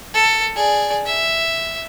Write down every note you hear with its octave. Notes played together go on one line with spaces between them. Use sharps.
A4
G#4 D5
E5